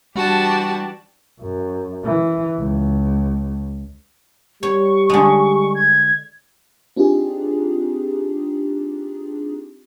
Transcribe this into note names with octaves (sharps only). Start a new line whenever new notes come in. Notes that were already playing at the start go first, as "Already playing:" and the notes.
E3 G3 D4 F#4 G4 A5
F#2
E3
C#2
G3 C#5 C#6
D3 G#3
G#6
C4 D4 D#4 F4 G4 G#4